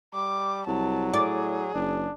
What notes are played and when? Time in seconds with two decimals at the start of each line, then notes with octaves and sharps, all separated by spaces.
0.14 G3 D6
0.67 C2 F#3 A5
1.13 A2 G#4 D5
1.74 F#1 D4